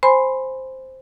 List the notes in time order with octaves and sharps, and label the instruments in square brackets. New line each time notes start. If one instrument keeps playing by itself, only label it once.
[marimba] C5 G#5 B5 C6